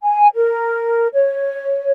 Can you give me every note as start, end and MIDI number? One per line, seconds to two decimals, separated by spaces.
0.03 0.28 80
0.34 1.08 70
1.14 1.90 73